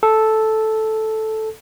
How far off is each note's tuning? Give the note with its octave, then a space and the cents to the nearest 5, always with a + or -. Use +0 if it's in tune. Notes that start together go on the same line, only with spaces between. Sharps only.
A4 -5